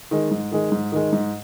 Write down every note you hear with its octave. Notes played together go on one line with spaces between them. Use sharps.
D#3 G#3
G#2
D#3 G#3
G#2
D#3 G#3
G#2